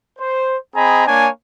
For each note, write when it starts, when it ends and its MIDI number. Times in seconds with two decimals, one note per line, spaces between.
0.19 0.57 72
0.75 1.05 60
0.75 1.05 68
0.75 1.05 75
0.75 1.05 80
0.75 1.05 82
0.75 1.05 83
1.07 1.29 58
1.07 1.29 62
1.07 1.29 73
1.07 1.29 80